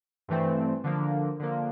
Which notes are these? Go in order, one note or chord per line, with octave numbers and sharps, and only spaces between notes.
G2 E3 A3 C4
D3 F3 A#3
D3 F3 A#3